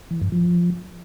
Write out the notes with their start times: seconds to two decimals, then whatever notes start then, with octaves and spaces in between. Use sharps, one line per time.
0.11 E3
0.21 G2
0.32 F3